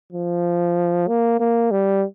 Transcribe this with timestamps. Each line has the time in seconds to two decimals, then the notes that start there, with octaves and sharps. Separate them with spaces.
0.13 F3
1.08 A#3
1.40 A#3
1.71 G3